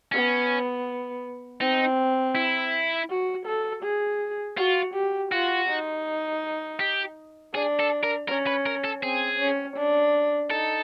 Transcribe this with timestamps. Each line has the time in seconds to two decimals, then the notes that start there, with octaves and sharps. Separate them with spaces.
0.12 B3 C#4
1.61 C4 D#4
2.35 E4
3.09 F#4
3.46 A4
3.83 G#4
4.57 F4 F#4
4.94 G4
5.32 F4 F#4
5.69 D#4
6.80 G4
7.54 D4 G#4
7.79 A4
8.03 A#4
8.28 C#4 A#4
8.47 B4
8.66 A#4
8.84 A4
9.02 C4 G#4
9.39 C#4
9.76 D4
10.51 D#4 A4